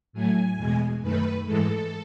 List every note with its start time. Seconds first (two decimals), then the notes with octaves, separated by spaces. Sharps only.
0.13 A2 F#3 A3 G#5
0.57 E2 B2 G#3
1.01 F#2 D#3 A3 B4
1.45 G#2 E3 G#3 A4